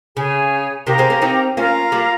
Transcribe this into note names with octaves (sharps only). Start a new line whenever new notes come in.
C#3 G#4 C#5 G#5
C3 D#3 G4 A#4 F5 A#5
G#3 C4
A#3 C#4
C4 D#4
A#3 C#4 F4 A#4 F5 A#5
G3 A#3